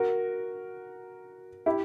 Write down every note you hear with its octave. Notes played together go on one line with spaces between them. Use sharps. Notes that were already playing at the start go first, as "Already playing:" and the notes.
Already playing: F#4 A#4
E4 G4